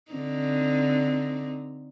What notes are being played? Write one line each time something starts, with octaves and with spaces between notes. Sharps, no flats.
D3 C4 D#4